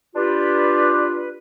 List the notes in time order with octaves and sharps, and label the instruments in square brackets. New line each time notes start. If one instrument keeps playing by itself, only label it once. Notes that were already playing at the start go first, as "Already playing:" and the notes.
[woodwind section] D4 F4 G4 B4